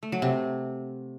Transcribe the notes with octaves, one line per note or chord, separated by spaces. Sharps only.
A3
F#3
C3